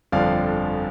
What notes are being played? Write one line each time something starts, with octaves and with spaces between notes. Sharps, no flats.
G1 F2 D3 F3 D5 F5